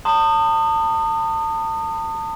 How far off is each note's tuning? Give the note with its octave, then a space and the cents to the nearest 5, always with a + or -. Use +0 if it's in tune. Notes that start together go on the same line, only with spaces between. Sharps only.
A5 +35 C6 -5 D#6 -20